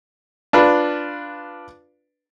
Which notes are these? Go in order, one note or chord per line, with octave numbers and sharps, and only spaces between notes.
D4 F4 B4